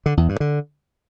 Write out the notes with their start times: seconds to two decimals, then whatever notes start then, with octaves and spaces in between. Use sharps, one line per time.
0.06 D3
0.17 E2
0.29 G2
0.40 D3